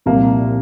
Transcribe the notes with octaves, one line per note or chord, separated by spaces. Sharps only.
C2 A#2 F3 A#3